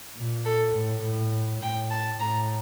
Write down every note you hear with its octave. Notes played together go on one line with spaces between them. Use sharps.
A#2
A4
A2
A2
A2 G5
A5
A2 A#5